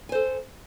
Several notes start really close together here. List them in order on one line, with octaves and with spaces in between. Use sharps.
G#5 C5 A4